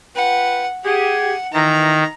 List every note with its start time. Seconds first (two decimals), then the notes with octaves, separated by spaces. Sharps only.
0.16 F4 B4 F#5 G5
0.84 G4 G#4 F#5
1.53 D#3 E3 A#5